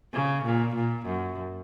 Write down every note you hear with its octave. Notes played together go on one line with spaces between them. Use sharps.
C#3
A#2
A#2
F#2